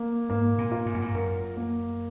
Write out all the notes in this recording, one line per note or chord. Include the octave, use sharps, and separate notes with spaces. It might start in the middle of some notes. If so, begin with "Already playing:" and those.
Already playing: A#3
G#2 A#3
A#2
F4
G#2
F#2
G#2
F#2 A#4
A#3